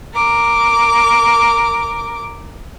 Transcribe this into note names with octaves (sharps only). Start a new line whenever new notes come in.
A#4 D6